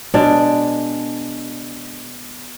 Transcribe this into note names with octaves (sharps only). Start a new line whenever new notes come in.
B2 G#3 D4 D5